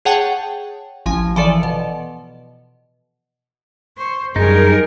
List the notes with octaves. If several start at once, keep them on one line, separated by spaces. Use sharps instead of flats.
G#4 C#5 F#5 G5 A5
A1 F3 G#5
E3 F3 A4 D5
B2
C5 C#6
F#2 G3 D#4 G#4 A#4